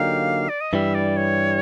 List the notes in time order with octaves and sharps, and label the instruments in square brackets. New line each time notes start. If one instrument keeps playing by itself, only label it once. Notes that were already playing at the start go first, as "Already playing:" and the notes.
Already playing: [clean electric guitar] D3 F#3 A#3 D#4 G4 [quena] F5
[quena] D5
D#5
[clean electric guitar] G2 E3 G3 [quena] E5
[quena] D5
C#5